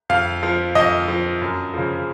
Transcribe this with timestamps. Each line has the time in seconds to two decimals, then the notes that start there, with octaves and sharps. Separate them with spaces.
0.09 F2 F5
0.43 F3
0.75 F2 D#5
1.08 F3
1.41 F#2
1.74 C#3 F3